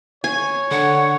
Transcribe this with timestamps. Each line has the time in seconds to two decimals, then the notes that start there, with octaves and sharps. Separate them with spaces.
0.24 C#5 G#5
0.71 D3 F#5